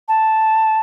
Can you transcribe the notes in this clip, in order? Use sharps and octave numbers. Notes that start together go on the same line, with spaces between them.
A5